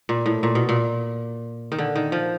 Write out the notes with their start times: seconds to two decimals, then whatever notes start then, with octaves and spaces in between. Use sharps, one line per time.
0.09 A#2
0.26 A2
0.43 A#2
0.55 B2
0.69 A#2
1.72 D#3
1.78 D3
1.95 D#3
2.12 F3